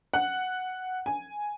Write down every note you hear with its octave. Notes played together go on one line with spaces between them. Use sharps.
F#5
G#5